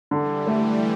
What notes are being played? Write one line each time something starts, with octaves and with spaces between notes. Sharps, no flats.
D3 E3 G3
A3